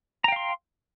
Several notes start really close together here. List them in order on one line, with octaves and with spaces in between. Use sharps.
A#5 G5 F5 C6